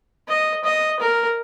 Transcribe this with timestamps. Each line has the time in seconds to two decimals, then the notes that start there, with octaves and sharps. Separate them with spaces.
0.29 D#5
0.65 D#5
1.00 A#4